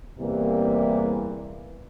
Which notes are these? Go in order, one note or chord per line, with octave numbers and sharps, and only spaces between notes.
E2 C3 E3 G3 A#3